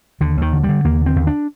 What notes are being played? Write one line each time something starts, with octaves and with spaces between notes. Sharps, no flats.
D#2 D3
D#2 D#3
D3
G3
D3
D#2 A#3
D3 C4
D#2
D4